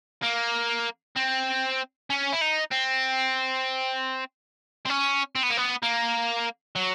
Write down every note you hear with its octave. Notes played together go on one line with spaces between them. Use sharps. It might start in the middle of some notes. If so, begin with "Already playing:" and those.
A#3
C4
C#4
E4
D#4
C4
C4
C#4
C4
B3
A#3
B3
A#3
F#3